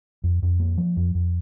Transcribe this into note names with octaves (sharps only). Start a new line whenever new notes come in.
F2
F2
A#3
F3
F2
F2